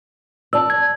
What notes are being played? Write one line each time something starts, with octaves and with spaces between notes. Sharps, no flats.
D5 A5 E6
G#6